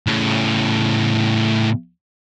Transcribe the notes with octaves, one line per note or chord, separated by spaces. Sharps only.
A2 C#3